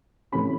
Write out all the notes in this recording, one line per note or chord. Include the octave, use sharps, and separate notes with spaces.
C3 E3 A3 C#4 B5